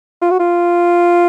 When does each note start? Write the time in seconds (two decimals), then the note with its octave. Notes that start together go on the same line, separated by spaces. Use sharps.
0.22 F4
0.30 F#4
0.40 F4